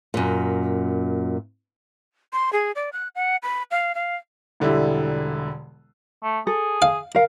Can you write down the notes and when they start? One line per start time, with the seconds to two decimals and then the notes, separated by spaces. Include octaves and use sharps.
0.14 F#2 A#2
2.33 C6
2.53 G#4
2.75 D5
2.93 F#6
3.15 F#5
3.43 B5
3.71 F5
3.95 F5
4.60 E1 D3 G3 E4
6.23 A3
6.47 G#4 A4
6.82 F5
7.15 A#4 F5